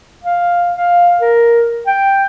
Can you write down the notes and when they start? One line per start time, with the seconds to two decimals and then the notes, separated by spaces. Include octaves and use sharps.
0.24 F5
0.72 F5
1.21 A#4
1.87 G5